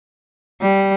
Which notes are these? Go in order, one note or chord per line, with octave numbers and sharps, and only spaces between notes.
G3